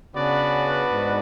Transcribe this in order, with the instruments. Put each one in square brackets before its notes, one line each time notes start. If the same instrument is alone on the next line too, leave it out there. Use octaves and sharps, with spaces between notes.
[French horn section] C#3 [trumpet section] B3 D4 F#4 B4 D5
[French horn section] G#2